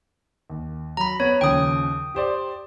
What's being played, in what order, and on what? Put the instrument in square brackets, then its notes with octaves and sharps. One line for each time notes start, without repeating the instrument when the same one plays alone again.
[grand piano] D#2
[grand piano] F#3 [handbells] A#5 B5
[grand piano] B3 [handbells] C#5
[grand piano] D#2 C#3 F3 [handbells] G5 D#6
[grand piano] G4 C5 D5